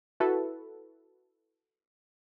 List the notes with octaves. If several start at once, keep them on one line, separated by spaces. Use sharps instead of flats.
E4 F#4 A4 B4